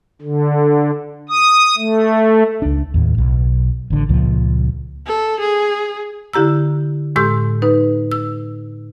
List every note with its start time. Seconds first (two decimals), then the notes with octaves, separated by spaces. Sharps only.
0.22 D3
1.29 D#6
1.78 A3
2.62 C#2 D4
2.94 D#2 A2
3.18 B1
3.90 A1 D3
4.09 C#2 A#2 F3
5.07 A4
5.40 G#4
6.33 D3 E4 G4 A#5 E6
7.16 A2 G#3 G4 C6 E6 G6
7.62 D#4 B4
8.12 E6